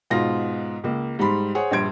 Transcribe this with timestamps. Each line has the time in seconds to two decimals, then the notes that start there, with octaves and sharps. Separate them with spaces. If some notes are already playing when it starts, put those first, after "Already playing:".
0.10 G#2 B2 F4 C6 A#6
0.84 C#2 A#3
1.19 G#2 G3 B5 C6
1.55 G#4 C5 C#5 F#5
1.71 A#1 G2 C6 G#6 D7